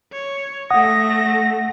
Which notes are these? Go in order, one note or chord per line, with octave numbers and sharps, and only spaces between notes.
C#5
A3 F#5 D#6 A#6